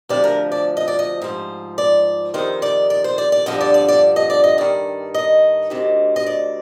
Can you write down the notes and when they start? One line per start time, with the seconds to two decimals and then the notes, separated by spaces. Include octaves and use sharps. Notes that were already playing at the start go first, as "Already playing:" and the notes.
0.09 D2 C3 F3 D5
0.24 A#4
0.52 D5
0.77 D#5
0.88 D5
0.99 D#5
1.22 G#2 F3 C5
1.78 D5
2.34 F2 C3 D#3 C5
2.62 D5
2.90 D5
3.04 C5
3.18 D5
3.32 D5
3.46 G2 D3 F3 D#5
3.61 D5
3.74 D5
3.88 D5
4.16 D#5
4.30 D5
4.44 D#5
4.58 G2 D#3 D5
5.14 D#5
5.70 D2 C3 D#3
6.16 D#5
6.26 D5